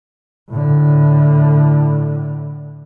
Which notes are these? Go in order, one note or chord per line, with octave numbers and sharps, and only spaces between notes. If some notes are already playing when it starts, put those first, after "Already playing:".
A2 D3